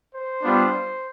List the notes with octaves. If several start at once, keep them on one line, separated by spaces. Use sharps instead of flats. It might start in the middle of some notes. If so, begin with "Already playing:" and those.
C5
G3 B3 D4 F4